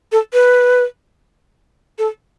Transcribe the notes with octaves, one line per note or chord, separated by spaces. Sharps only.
A4
B4
A4